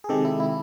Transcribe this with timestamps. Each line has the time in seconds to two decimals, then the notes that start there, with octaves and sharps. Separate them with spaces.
0.04 G#4
0.09 C3 D#3 G#3 G4 A4
0.25 E4
0.40 E4